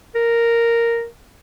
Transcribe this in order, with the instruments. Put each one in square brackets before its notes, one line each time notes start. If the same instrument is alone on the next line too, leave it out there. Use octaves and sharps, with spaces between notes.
[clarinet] A#4